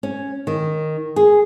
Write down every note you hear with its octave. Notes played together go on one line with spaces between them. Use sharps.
C#4
D#3
G#4